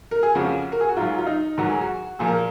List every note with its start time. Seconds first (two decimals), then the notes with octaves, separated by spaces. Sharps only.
0.11 A#4
0.23 G#4
0.35 F2 C#3 F3 F#4
0.72 A#4
0.81 G#4
0.89 F#4
0.96 G#2 F#3 F4
1.18 F4
1.27 D#4
1.58 G#2 D#3 F#3 F#4
1.70 G#4
1.81 F#4
2.19 A#2 F3 G#4
2.27 A#4